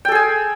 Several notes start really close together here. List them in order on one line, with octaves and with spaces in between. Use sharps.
G5 A4 G#4 G#5